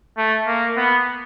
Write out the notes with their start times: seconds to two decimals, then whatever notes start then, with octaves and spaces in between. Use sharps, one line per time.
0.18 A3
0.47 A#3
0.77 B3